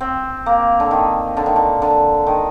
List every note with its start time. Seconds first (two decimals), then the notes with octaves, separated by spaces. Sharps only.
0.01 C4
0.46 A#3
0.80 D3
0.91 D#3
1.37 D3
1.46 D#3
1.56 D3
1.82 D3
2.27 D#3